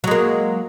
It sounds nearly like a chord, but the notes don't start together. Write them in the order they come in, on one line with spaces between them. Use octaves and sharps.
F#3 G#3 A#3